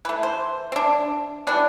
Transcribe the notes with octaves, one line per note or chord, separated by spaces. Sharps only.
E3 A3 B4
C5
C4
D4
E3 G3 B3 D4